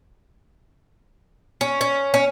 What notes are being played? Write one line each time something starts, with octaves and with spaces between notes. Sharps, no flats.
C#4
C#4
C#4